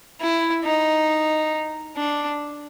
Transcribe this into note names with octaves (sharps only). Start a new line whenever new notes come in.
E4
D#4
D4